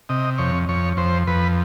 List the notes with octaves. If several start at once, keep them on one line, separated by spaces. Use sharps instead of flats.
C3 D#5
F2 C#5
F2 C#5
F2 C5
F2 B4